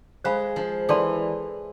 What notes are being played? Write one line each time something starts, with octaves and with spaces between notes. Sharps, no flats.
G#3 C5 F5 B5
F3
E3 A4 D5 A5 C6